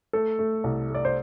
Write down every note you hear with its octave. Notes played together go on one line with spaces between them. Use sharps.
A3 A4
A3
C2
A3 D5
C5